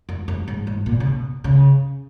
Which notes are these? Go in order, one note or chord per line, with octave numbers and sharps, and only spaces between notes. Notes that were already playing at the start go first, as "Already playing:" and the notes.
F#2
F#2
G#2
G#2
A#2
C#3
B2
C#3